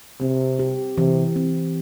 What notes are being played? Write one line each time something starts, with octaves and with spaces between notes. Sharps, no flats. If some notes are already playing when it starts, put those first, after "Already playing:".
C3 C4
G4
C3 E3
C4